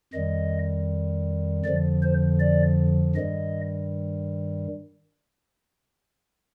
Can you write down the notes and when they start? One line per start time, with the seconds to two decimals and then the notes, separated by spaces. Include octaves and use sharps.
0.13 F2 D#3 G3 D#5
1.64 F2 D3 F3 D5
2.03 C5
2.40 D5
3.16 G2 D#3 G3 D#5